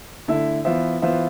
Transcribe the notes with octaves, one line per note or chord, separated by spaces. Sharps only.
D3 A3 E4 A4 E5
E3 B3 F4 C5 E5
E3 B3 F4 C5 E5